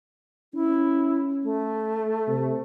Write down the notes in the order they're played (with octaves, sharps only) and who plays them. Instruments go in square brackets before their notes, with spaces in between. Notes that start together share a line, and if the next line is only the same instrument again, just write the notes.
[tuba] C#4 [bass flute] E4
[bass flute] A3
[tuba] C3